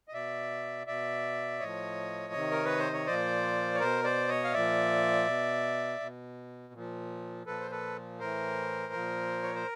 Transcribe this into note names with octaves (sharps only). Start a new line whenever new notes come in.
D#5
B2 D5 E5
B2 D5 E5
A2 F3 C#5 D#5
C3 D#3
A#4
B4
C5
C#5
A#2 F3 C5 D5
C#5
B2 A#4 C5
C5 D5
C#5 D#5
F5
A#2 F3 D5 E5
B2
B2
A#2 F3
A#2 F3 A4 B4
C5
A4 B4
A2 E3 A#4 C5
A#2 F3
C#5
C5